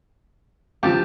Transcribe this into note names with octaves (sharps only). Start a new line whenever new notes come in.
C#2 F3 G4 A5